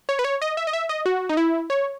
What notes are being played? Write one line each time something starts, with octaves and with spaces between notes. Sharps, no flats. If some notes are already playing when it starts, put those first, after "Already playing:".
C#5
B4
C#5
D#5
E5
D#5
E5
D#5
F#4
D#4
E4
C#5